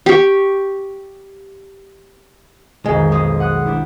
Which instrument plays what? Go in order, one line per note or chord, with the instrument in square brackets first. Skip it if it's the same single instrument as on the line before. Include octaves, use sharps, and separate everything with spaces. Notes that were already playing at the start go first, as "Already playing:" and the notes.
[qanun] G4 C#6
[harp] B1 F2 D#3 [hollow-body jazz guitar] G#3
[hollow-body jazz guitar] B1 G#3 [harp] D#6
[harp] F#5 D#6 F#6
G3 D4 E4